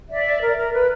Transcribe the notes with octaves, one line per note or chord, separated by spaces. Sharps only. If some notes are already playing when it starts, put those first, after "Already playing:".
D5 E5
A#4
A#4
B4